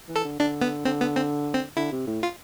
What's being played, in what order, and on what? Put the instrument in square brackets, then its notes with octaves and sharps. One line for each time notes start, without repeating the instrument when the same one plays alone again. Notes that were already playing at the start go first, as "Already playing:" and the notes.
[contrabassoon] E3
[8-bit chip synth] A4
[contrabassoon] D3
[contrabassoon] D3 [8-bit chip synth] D4
[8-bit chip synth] B3
[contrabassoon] D3 [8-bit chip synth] C4
[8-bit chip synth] B3
C4
C4
[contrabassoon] D3 [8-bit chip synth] E4
[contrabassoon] C3
A2
[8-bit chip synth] F4